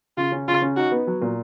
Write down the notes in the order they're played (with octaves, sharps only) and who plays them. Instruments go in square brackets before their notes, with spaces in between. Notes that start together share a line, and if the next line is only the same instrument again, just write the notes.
[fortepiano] C#3 [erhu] F4
[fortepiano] C#4
[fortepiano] C#3 [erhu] F4
[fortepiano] C#4
[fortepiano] D#4 [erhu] F#4
[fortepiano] B3
F#3
A#2